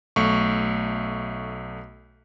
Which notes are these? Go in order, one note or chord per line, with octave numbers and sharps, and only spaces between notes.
B1 A3 C#6